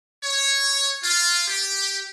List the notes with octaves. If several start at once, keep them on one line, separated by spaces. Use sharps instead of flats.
C#5
F4
G4